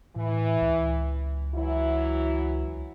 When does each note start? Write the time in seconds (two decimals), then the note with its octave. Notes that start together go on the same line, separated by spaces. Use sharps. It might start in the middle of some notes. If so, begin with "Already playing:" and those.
0.16 A2 E3
0.61 C#2
1.55 E3 F#3 E4